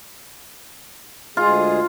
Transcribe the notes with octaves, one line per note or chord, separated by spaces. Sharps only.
D2 G#3 F4 G#4